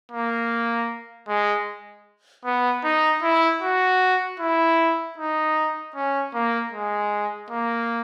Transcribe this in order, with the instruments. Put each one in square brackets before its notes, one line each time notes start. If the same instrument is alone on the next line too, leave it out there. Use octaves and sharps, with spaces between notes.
[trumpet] A#3
G#3
B3
D#4
E4
F#4
E4
D#4
C#4
A#3
G#3
A#3